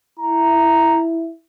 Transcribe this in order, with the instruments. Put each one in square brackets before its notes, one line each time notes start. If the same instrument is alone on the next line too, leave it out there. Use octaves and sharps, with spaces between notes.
[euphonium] E4 [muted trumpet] A#5